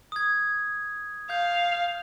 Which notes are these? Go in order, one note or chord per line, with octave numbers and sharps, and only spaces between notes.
D#6 G#6
F5 G6